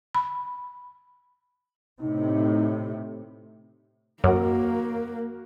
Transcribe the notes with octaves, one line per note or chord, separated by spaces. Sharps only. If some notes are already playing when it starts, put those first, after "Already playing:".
B5
A2 C3 D#4
F#2 A#3 F#4 A#4 F#5